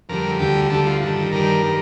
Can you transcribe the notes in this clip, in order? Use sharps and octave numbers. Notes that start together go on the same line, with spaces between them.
F2 D3 G3 A#4
D2 D3 G3 G4
D2 D3 G3 A4
F4
G2 D#3 G3 A4
G2 D#3 G3 A#4
D#3 G3